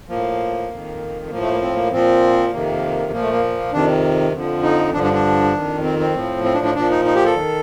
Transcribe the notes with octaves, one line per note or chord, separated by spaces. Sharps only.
A2 F3 A#3
F2 D#3
A2 F3 A#3
A3
A#3
C4
A#3
A#2 F3 C4
F2 C3 D#3 A#3
A#2 F3 A#3
A3
A#3
A#3
F2 C3 D#3 D4
F2 D3 F3
D#4
G2 D3 F3 D4
D4
D4
F2 D#3
C4
C4
A2 F3
C4
D4
D4
A#2 F3 D4
D#4
D#4
G4
A4
D#3